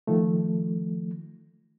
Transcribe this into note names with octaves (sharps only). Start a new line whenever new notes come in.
D#3 F3 A3